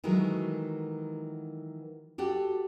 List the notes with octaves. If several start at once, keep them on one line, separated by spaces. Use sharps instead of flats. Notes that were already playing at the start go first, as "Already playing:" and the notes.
D#3 E3 F#3 G#3 A3
F#4 G4 A4